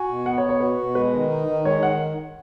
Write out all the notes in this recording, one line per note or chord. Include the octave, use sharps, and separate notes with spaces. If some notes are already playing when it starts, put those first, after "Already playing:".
Already playing: F#4 G#5
B2
B3 F#5
C#5
B2
C#5
F#4 B4
B2
G#3 B4
D#3
D#4
D#3
G#3 C#5
D#3 F#5